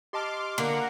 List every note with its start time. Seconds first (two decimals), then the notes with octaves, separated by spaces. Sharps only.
0.13 G4 D#5 A5 C6 D6 F6
0.58 D3 A#3 A#4 F#5